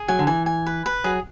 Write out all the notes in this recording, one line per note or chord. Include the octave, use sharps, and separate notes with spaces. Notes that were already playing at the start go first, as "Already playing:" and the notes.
Already playing: G#4
F#3 G#5
D3
E3 G#5
G#5
B4
B4
F#3 G#4